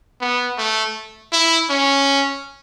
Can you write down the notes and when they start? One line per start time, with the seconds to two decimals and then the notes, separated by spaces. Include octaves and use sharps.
0.21 B3
0.58 A3
1.33 E4
1.70 C#4